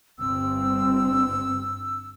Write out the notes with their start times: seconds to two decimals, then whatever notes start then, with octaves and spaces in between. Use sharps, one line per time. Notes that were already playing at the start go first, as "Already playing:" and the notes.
0.19 G1 G2 C4 E6